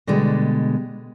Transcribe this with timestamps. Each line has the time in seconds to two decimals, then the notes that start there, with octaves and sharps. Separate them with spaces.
0.07 B2 D3 G3 G#3